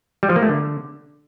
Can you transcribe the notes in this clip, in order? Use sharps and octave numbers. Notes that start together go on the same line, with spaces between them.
G3
F3
A#3
A3
D3